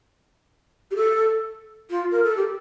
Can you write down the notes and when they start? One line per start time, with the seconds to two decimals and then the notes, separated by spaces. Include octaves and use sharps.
0.91 G4
0.96 A4
1.90 F4
2.11 A#4
2.24 A4
2.37 G4